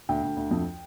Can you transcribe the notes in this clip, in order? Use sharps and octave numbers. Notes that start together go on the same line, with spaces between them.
D2 G5
D2
D2
F2